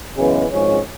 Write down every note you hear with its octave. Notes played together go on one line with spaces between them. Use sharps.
F#2 C#3 E3 G#3 B3
G#1 G#2 F3 G#3 C#4